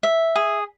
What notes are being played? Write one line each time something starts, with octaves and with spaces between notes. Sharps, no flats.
E5
G#4